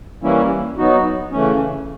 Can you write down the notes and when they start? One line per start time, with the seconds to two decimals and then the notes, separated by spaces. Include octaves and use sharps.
0.23 E3 G3 A#3 C#4 E4
0.77 F#3 B3 D#4 F#4
1.32 C#3 E3 A3 C#4